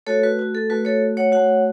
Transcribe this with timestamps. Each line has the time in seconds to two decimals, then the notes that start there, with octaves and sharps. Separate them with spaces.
0.07 A3 F#4 A4 C#5
0.23 F#4 B4
0.39 F#4
0.55 A4
0.70 A3 F#4 B4
0.85 A4 C#5
1.17 C#5 F#5
1.32 A3 F#4 C#5 F#5